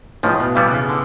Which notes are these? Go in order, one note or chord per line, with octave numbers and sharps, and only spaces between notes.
C#2 A2 C#3 F3
B2
G2 E3 G3 B3
C#3
D3